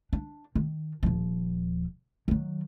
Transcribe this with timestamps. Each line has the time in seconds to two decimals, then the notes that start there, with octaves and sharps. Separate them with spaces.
0.13 D4
0.55 D#3
1.03 D#1 F3
2.28 D#3 F#3